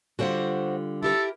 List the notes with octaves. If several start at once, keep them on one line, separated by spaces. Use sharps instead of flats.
D3 G3 F4 F#4 C5 F#5
E4 G4 A4 A#4